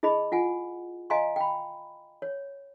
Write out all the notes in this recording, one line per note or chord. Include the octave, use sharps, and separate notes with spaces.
E4 G#4 D#5 B5
F4 F#5 G#5
D#5 F5 G#5 A#5 C6
G5 B5
C#5